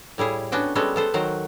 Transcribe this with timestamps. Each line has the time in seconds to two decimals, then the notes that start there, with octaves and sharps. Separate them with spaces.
0.18 A2 G3 E4 G#4
0.52 B3 C#4 D4 F#4 G5
0.75 G3 G#3 B3 C#4 F#4 A4
0.96 B3 A4 C5
1.14 D#3 F#3 F#4 C5